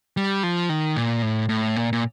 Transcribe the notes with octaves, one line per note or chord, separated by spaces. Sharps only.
G3
F3
D#3
A#2
A2
A2
A#2
A#2